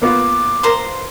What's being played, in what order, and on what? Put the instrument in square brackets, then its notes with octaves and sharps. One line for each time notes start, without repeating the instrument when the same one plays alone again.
[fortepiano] A#3 B3 F4 [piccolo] D6
[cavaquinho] A#4 C5 C6